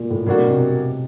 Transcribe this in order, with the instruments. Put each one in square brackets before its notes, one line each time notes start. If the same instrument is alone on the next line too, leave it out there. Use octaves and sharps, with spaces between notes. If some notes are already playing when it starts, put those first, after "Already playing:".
Already playing: [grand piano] A#2
A2
[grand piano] A2 [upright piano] F#3 A#3 D4 F#4
[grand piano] B2
C3